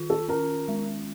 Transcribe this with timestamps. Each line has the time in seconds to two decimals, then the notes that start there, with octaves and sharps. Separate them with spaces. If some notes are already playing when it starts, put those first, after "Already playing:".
Already playing: D#3 F4
0.10 A4
0.29 C#4 A#4
0.68 G#3